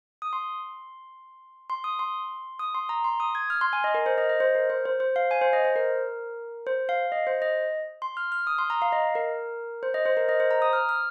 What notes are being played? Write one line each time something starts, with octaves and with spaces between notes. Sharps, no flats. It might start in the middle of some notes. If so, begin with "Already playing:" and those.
D#6
C6
C6
D#6
C6
D#6
C6
A#5
C6
D#6
G#6
F6
C6
G#5
D#5
A#4
C5
D#5
D#5
C5
A#4
C5
C5
C5
F5
G#5
C5
D#5
C5
A#4
C5
F5
D#5
C5
D#5
C6
F6
F6
D#6
C6
A#5
F5
D#5
A#4
C5
D#5
C5
A#4
D#5
C5
A#5
D#6
F6
F6